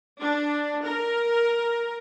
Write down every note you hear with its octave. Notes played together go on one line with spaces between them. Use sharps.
D4
A#4